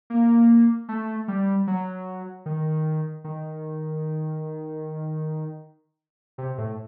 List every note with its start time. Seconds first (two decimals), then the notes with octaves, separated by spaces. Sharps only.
0.10 A#3
0.89 A3
1.28 G3
1.67 F#3
2.46 D#3
3.24 D#3
6.38 C3
6.58 A2